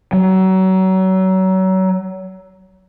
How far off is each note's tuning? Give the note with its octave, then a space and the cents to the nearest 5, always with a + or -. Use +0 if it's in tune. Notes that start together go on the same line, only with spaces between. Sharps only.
F#3 +30